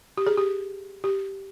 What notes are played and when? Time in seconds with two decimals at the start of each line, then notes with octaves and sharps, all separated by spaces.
0.17 G4
0.27 G#4
0.38 G4
1.04 G4